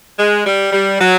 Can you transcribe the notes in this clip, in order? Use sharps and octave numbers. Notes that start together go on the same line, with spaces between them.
G#3
G3
G3
F#3